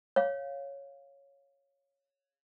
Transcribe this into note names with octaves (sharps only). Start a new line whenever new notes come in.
C#5 F5